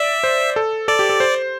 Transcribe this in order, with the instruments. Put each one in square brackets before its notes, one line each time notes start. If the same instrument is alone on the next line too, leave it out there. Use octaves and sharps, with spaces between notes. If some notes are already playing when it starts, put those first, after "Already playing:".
Already playing: [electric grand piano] D5 [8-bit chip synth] E5
[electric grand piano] C5
A4
[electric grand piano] A4 [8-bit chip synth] D5
[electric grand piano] G4
A4
C5